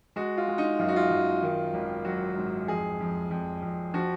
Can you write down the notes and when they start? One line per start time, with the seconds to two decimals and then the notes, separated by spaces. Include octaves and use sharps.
0.16 G#3 F#4
0.37 F4
0.48 G#3
0.58 D#4
0.79 F#2 F4
0.88 F#4
0.96 F4
1.11 F#2
1.43 D#3
1.74 G#1
2.05 F#3 F#4
2.36 G#2
2.68 F2 G#4
3.00 F2
3.31 F2
3.62 F2
3.94 F3 F#4